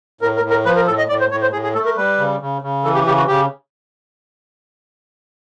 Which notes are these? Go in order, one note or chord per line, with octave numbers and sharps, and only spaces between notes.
A2 A#4
A#4
A2
A#4
F3 B4
A#4
A2 A4
D#5
A2 D5
C5
A2 C#5
C5
A2 G#4
G#4
A3 A4
A#4
G3 B4
C#3
C#3
C#3
E3 A4
G4
C#3 G4
F#4
C#3 G4